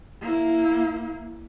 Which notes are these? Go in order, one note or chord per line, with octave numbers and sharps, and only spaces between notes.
A#3 E4